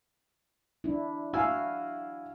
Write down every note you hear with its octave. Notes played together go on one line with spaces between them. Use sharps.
D4 E4
E4 F#4 F5 G#5 E6